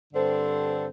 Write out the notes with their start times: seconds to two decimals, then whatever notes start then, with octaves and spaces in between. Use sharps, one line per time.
0.12 G2 D3 C4 A4 C5